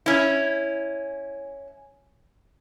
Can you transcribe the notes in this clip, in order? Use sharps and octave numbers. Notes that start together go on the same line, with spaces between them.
C#4 E4